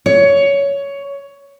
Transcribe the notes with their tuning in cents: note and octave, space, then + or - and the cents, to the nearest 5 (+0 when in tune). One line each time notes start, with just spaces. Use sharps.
C#5 +15